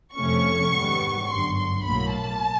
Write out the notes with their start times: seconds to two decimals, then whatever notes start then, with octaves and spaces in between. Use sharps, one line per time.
0.15 F2 C3 F3 A3 C#4 C#6
0.72 G#2 D#3 G3 B3
1.27 G1 F#2 D3 C6
1.55 C6
1.83 B1 A2 F#3 A#3 B5
2.11 A5